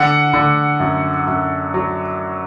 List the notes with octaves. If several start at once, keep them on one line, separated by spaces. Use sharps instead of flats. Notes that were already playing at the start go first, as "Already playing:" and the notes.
Already playing: D3 F#5
D3
F#2
F#2
F#3